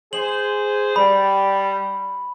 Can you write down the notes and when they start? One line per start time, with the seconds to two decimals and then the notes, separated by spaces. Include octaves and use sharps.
0.13 G#4 C5 F#7
0.96 G3 B5